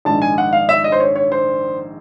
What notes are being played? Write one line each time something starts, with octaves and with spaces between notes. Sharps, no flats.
A#1 G#2 D#3 A5
G#5
F#5
F5
E5
D#5
C5
C#5
C#5
C5